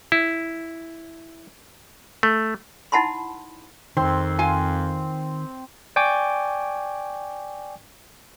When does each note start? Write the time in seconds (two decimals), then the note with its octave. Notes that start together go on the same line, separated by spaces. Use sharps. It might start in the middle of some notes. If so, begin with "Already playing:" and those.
0.12 E4
2.23 A3
2.92 D#4 E4 F#5 A5 B5 C6
3.97 F2 D#3 C4 C6
4.39 F4 F5 G#5
5.96 D5 G5 G#5 C#6 D6